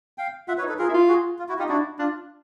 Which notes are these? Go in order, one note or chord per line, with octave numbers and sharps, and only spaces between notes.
F5 G5
F4 E5 F#5
B4 C#5
D#4
A4 B4
F4 G#4 A#4
E4
F4
F#4 G#4
F4
E4 F#4
D#4 F4 G4
D4 E4 F#4
D4 F4